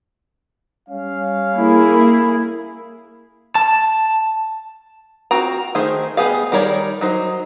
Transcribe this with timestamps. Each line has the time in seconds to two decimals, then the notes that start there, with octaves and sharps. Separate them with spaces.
0.89 G3 C#4 F5
1.55 A#3 E4 G#4
3.55 A5
5.31 C4 F4 F#4 G5 A#5
5.75 D#3 A3 G#4 C5
6.17 B3 G4 G#4 F5
6.52 D#3 G3 A#4 C#5 D5
7.01 F#3 D#4 C5